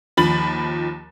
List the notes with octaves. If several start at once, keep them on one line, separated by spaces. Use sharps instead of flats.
D#2 F3 B5 A6 F#7